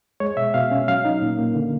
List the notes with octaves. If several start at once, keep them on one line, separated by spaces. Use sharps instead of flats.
G#3 C#5
B2 E5
B2 F5
C#4
F#3 F5
D#4
A#2
A#3
D3